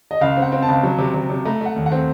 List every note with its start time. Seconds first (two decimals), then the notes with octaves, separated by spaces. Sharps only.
0.11 D#5
0.21 C#2 F5
0.37 C4
0.42 F#5
0.52 C4
0.63 A5
0.68 C#2
0.83 F#3
0.98 C3
1.14 C3
1.30 C3
1.45 A3 A#5
1.61 A3 F#5
1.76 D#2
1.86 F#5
1.92 C4